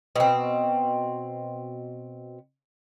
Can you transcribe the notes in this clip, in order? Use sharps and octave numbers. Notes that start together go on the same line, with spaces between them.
B2 C4